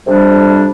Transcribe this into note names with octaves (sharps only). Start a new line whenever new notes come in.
F2 C3 G3 D4